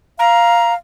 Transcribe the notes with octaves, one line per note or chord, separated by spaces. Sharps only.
F5 A#5